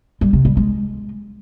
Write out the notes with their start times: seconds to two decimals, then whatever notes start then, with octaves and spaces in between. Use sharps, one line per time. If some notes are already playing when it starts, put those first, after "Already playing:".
0.21 G3
0.33 C3
0.45 G3
0.57 G#3